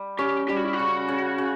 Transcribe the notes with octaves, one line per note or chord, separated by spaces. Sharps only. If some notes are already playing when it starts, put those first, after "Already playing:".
Already playing: G3
C#4 G4
G3 G4
F#4
E4
F#4
C#3
C#3
C#3